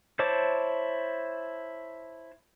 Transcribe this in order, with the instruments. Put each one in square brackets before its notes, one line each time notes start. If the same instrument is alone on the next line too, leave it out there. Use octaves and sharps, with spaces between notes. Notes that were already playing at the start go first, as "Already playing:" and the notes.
[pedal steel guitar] E4 C5 C#5 A5 D6